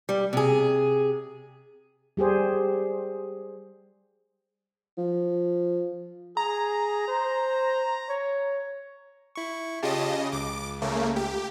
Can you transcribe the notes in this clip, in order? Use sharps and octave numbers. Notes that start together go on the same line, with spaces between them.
G3
C3 G#4
G3 G4 G#4 C5
F3
G#4 A#5
C5
C#5
E4 C#6
C#3 F4 G4 D#5 A5
C#2 D6
C#3 A3 A#3
G4